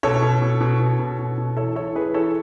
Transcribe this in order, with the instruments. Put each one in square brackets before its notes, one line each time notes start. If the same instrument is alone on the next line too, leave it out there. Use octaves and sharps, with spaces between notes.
[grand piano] B2 A4 C#5
B2
B2
B2
B2
B2
B2
B2
E3 A4 C#5
E3 A4 C#5
E3 G#4 B4
E3 A4 C#5